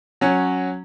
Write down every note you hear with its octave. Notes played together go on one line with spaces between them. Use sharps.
F#3 C#4